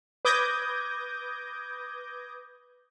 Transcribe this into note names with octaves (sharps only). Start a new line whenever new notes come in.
B4 D6 D#6 G6 G#6 A#6